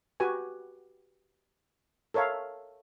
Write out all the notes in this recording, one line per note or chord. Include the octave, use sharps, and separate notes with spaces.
F#4 G4 B4 G#5
A4 A#4 C#5 E5 F5